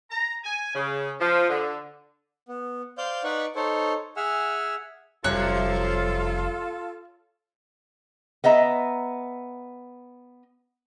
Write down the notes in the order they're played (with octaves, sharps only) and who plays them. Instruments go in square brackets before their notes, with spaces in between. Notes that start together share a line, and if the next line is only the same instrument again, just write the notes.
[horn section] A#5
G#5
C#3
F3
D3
[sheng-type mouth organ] B3
C5 D5 F5 G6
D#4 B4 D5 F#5 B5 C#6
D#4 A4 C5 C#5
G#4 E5 F#5 G#5 E6 F6
[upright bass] F1 G3 [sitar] F#2 C3 [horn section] F4 A4 [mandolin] C#5 F#6
[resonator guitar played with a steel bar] B3 D#5 E5 A#5